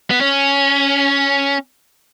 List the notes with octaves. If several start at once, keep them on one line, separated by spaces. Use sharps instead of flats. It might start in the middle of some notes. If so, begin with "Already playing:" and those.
B3
C#4